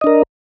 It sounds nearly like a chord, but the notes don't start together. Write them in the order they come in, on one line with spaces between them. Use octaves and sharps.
D#5 D4 A#4